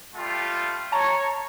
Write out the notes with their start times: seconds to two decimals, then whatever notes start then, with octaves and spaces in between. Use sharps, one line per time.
0.16 G3 A3 F4
0.92 C#5 A5 A#5